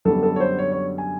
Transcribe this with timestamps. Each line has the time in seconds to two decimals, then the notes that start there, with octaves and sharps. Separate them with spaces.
0.05 F#2 D3 G3 B3 A4
0.23 A4
0.36 C#5
0.40 C5
0.59 C#5
0.72 C#5
0.98 G#5